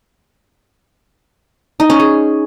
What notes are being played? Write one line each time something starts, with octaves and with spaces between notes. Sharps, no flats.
D#4
C#4
G#4